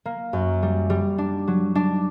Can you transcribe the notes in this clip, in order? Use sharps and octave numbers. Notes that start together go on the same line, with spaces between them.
A#3
F#2
G3
G3
D4
F#3
D4